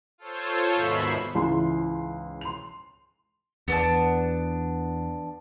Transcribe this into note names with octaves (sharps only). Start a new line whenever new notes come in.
F4 A4 C5 C#5
D#2 G#2 B2 E5 B5 C7
C#2 G#2 E3 E4 C6
C6 F7
E2 B3 D4 A5